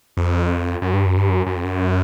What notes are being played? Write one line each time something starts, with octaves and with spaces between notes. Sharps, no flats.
F2
F#2
G2
F#2
G2
F#2
F#2
F2
F#2